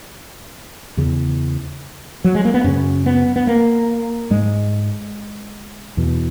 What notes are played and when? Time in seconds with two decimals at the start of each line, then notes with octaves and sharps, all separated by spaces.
0.97 E2 C#3
2.24 F#3
2.35 G#3
2.45 A#3
2.54 B3
2.64 F#2 C#3 C#4
3.06 B3
3.36 B3
3.47 A#3
4.30 G#2 G#3
5.97 E2 B2